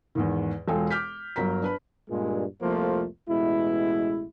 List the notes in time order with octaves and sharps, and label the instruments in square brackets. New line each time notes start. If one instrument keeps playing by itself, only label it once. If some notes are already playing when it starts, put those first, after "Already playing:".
[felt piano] E2 G#2 D#3
E1 G#3 F4 A4 G5
D6 F6 G6 B6
G1 F#3 A#4 A#5 B6
D4 B4 B5
[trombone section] G2 A#2 G#3
C2 F2 F3 A3 A#3 C5
A1 B2 G#3 E4